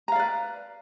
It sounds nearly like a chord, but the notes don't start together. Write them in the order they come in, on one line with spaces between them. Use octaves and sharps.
A#5 F5 D5 B4